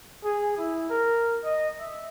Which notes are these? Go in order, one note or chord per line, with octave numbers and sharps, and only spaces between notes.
G#4
E4
A#4
D#5
E5